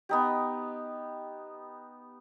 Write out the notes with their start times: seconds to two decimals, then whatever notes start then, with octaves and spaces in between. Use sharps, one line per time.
0.09 B3 D#4 G4